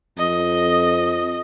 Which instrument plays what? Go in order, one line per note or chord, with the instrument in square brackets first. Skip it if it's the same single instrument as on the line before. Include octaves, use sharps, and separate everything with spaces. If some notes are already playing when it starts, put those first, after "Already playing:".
[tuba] F2 [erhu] D#5